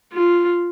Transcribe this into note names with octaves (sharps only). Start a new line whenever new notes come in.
F4